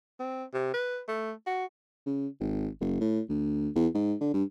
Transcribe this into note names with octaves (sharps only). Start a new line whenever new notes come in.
C4
C3
B4
A3
F#4
C#3
G#1
F#1
A2
D2
E2
G#2
D3
G2